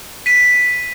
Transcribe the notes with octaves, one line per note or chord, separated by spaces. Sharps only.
B6 D#7